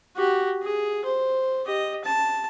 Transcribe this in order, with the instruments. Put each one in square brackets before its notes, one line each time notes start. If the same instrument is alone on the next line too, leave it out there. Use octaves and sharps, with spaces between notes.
[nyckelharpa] F#4 G4
G#4
C5
G4 D#5
A5